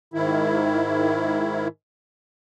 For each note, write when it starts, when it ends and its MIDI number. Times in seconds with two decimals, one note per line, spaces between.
0.14 1.68 44
0.14 1.68 51
0.14 1.68 64